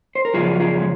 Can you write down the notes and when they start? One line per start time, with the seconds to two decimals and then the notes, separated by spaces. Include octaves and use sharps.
0.15 C5
0.25 A#4
0.33 F#2 C#3 F3 F4 G#4
0.53 F#4
0.60 F4 G#4
0.79 G#3